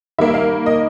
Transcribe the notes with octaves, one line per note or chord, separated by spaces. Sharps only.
D#3 G3 A#3 E5
F5
D#5